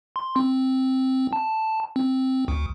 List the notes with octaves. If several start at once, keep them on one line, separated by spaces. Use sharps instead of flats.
C6
C4
A5
C4
D2